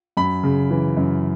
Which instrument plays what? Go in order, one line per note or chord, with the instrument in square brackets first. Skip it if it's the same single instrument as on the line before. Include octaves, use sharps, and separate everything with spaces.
[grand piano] F#2 B5
C#3
E3
F#2